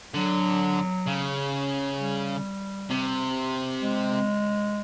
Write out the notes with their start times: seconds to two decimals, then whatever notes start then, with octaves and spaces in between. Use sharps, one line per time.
0.14 D3 F#3
1.06 C#3
1.98 G3
2.90 C3
3.82 G#3